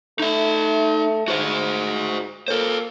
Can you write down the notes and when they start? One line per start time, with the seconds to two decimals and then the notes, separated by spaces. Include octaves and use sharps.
0.20 A3 D#4 E5
1.28 G#2 F#4 C5
2.48 A#3 A4 C5